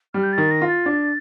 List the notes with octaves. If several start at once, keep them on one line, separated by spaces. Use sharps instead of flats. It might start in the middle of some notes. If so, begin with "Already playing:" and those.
G3 F6
G6
A6
D#3
A#6
F4
A6
D4